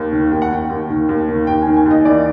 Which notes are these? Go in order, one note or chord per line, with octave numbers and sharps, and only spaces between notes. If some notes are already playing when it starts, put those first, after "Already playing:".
Already playing: D#2
D#3
D#2 G5
F#5
D#3 G5
D#2
D#3
D#2
D#3
D#2 G5
D#3 G#5
G#5
D#2 D#5
E3 D5